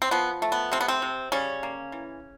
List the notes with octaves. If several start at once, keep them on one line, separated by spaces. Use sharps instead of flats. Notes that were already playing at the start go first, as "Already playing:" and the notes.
C4
F3 B3
A3
B3
C3 C4
B3
C4
C3
C#3 G3 C#4
A#3
E3